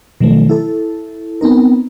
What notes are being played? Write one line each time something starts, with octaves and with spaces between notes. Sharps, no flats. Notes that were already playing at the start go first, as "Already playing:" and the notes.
B2 D#3 F3 F#3 A3
E4 A4
B3 C4 D#4 A#4